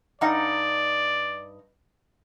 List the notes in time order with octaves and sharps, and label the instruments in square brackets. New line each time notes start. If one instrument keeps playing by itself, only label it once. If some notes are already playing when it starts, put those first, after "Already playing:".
[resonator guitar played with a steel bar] G2 D#4 F#5 [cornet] D5